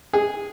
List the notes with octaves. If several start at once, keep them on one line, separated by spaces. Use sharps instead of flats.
G#4